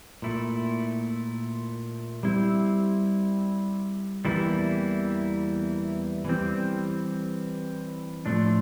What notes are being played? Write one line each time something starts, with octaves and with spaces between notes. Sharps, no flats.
A#2 A3 E4
G3 C4 E4
E2 E3 G3 A#3 E4
E3 G3 C4
A2 F3 A3 D4